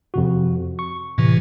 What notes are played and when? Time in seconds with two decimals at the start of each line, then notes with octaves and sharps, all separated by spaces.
0.14 F2 C3 F#4
0.79 C#6
1.18 A2 C3 E3